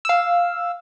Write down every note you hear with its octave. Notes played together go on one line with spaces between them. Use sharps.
F5 E6